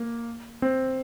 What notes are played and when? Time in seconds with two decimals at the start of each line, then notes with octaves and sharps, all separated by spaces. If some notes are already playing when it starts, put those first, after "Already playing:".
Already playing: A#3
0.62 C4